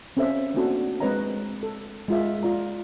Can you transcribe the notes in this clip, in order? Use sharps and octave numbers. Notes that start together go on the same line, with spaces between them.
C4 C#4 A4 C5 E5 F5
A3 A#3 C4 D4 F#4 A4
G#3 C4 B4 C#5 D#5 A#5
A4
G#3 F4 E5
F4 D5 A#5